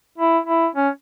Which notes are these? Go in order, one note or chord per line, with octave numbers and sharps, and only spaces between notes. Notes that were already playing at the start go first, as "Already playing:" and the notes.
E4
E4
C#4